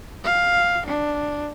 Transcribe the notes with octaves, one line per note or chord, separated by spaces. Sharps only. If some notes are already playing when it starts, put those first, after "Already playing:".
F5
D4